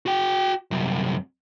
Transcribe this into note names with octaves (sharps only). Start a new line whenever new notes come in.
F#4 G5
C2 F#2